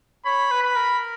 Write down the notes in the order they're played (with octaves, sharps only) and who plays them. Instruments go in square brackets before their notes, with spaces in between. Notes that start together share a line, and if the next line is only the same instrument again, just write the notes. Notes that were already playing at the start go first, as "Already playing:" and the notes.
[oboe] C#5 [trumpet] B5
[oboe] B4
[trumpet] B5
[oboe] A#4